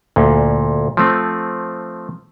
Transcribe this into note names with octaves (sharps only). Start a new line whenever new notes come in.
D2 A#2
F3 A3 C4